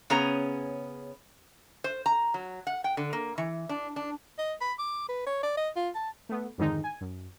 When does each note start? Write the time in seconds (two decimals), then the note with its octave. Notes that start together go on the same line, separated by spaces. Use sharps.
0.10 C#3 B3 C#4 G#4 A#5
1.84 C5
2.06 A#5
2.34 F#3
2.67 F#5
2.84 G5
2.97 D3
3.13 A#3
3.38 E3
3.69 D4
3.96 D4
4.39 D#5
4.61 B5
4.79 D6
5.09 B4
5.26 C#5
5.43 D5
5.57 D#5
5.76 F4
5.95 A5
6.29 A3 B3
6.58 F2 G#2 D3 D#3 G#3 D#4
6.84 G#5
7.01 F#2